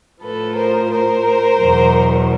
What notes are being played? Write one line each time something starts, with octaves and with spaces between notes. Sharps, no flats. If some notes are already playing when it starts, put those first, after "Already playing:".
A2 F3 A4 B4
A#4 C5
A#4 C5
E2 B2 F#3